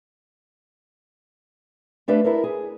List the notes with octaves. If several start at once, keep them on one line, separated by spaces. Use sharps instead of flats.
A3 D4 G4 B4 F5
E4 A4 A#4
G#4